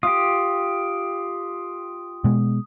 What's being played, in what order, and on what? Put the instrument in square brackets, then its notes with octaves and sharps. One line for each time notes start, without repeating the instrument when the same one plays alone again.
[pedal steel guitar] F4 G4 [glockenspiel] D#6
[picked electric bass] B2 G#3